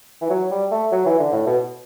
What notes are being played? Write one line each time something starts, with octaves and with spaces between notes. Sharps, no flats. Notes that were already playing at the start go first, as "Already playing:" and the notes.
E3
F#3
G3
A3
F#3
E3
D3
A2
B2